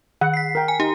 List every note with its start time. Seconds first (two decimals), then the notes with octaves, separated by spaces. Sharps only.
0.21 D#3 F#5
0.34 B6 C7
0.55 A#4 G5
0.68 G#5
0.80 D#4 G4